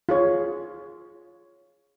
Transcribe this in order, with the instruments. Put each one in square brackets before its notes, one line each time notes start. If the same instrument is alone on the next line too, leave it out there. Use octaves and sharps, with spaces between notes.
[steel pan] F4 G#4 C#5